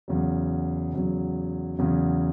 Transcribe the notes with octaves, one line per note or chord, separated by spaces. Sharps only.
E2 C#3 F#3
E2 C#3 F#3
E2 C#3 F#3